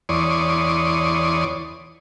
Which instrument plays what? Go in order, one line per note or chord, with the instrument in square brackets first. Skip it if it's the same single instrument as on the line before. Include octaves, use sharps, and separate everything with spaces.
[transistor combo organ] E2 C#5 D5 C6 D#6